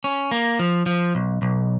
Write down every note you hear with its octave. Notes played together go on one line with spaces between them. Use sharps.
C#4
A#3
F3
F3
B1
B1